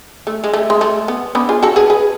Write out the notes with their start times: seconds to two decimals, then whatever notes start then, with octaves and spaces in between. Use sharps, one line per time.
0.27 A3
0.44 G#3
0.53 A3
0.70 G#3
0.81 A3
1.08 B3
1.35 B3 D4
1.49 F4 G#4
1.62 F#4 A4
1.76 G#4 B4
1.90 G#4 B4